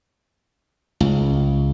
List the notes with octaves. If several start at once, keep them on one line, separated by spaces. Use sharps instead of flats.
C#2